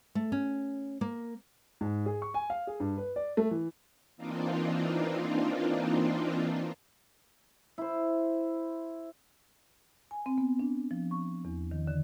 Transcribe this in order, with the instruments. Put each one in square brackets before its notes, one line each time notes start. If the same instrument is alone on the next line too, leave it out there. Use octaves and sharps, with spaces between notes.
[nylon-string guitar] A3
C#4
A#3
[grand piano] G#2
G#4
C#6
G#5
F5
G#4
G2
B4
D5
A3
E3
[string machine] E3 A#3 C4 D4 D#4 F4
[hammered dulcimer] E4 C5
[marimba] G#5
C4
B3
D4
F3
C#6
E2
D#3
D3